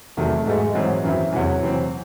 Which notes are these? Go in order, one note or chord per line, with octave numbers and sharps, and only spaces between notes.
E2 C3 D#3 F#3 A3
G#2 F#3 G#3 A3
G#2 E3 F#3 C4 E4
F#2 D#3 E3 F#3 C4 E4
E2 C3 E3 F#3
C3 E3 C4